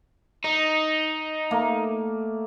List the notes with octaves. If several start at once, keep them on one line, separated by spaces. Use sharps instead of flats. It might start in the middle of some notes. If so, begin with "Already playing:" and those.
D#4 D#5
A3 A#3